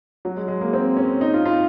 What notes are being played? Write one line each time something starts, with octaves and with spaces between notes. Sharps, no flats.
F#3
G#3
G#3
A#3
C4
C#4
D#4
F4
F4